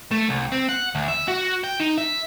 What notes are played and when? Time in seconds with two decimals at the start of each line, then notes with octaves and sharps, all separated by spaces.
0.11 A3
0.29 C2
0.52 C4
0.69 F#5
0.95 D2
1.08 E5
1.28 F#4
1.64 G5
1.80 D#4
1.98 E5